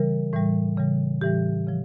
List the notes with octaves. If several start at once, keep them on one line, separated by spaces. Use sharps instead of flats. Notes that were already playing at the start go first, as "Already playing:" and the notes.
Already playing: C#3 E3 G3 A#4
A2 E3 G3
C#3 E3 G3
A2 E3 G3 G4
C#3 F3